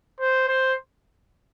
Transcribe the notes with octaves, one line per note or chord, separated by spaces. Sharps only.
C5
C5